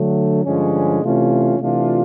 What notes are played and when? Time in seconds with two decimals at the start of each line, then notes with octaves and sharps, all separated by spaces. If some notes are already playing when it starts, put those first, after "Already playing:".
Already playing: D3 F#3 A3
0.45 G2 D3 F3 G#3 C#4
1.01 C3 E3 A3 C#4 F4
1.59 C3 E3 A3 D4 F4